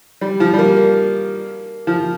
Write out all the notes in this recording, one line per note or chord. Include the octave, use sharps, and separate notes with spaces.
G3
F3
G3
A#3
A#3
F3